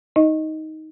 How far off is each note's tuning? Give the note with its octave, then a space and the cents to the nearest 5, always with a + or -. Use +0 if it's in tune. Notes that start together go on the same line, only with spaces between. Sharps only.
D#4 +10 D#5 +0